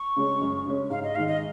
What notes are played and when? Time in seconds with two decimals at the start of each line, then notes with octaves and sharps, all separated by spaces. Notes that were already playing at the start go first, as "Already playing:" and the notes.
Already playing: C#6
0.16 C#3 G#3 C#4
0.41 F#2
0.66 C#3 G#3 C#4
0.90 G#2 F5
1.04 D#5
1.15 D#3 G#3 D#4 F5
1.28 D#5